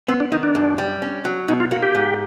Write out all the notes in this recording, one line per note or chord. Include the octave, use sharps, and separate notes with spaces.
B3 C4
D4
D#3 D#4
D4
F#2
G3
C#4
F#3
B2 D#4
F4
A#3 F#4
G4
G#2